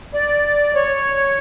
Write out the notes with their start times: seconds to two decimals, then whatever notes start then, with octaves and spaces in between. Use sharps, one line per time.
0.14 D5
0.75 C#5